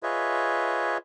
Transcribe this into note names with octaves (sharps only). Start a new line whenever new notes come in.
F4 G#4 B4 C#5 D#5 E5